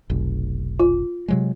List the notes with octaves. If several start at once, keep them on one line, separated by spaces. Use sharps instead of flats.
F1 B1
F4
C3 F#3 G#3